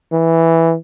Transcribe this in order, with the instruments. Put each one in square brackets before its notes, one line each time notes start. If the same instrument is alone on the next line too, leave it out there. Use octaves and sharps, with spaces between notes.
[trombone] E3